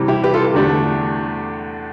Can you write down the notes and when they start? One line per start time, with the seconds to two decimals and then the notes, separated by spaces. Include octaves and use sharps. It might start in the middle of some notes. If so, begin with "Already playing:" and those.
Already playing: C3 E3 G3
0.08 E4 G4
0.24 G4 B4
0.34 F4 A4
0.54 E2 D3 A3 D4 G4